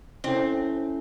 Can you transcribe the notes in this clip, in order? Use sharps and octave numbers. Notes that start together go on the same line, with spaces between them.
C4 C#4 E4 A4